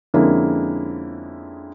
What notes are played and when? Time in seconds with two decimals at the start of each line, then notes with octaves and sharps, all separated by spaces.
0.14 F2 D3 G#3 A#3 C#4 E4